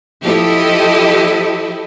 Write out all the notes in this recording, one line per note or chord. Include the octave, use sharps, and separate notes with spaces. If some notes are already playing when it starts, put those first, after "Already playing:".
F3 E4 G4 A4 D#5